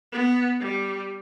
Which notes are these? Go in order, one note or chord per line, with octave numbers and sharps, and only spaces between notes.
B3
G3